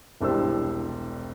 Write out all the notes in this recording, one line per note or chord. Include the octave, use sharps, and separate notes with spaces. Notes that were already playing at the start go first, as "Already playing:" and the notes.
E1 C2 D4 G4 C5 E6